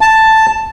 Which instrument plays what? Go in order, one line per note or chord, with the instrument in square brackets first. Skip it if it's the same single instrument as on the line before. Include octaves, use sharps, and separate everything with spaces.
[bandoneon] A5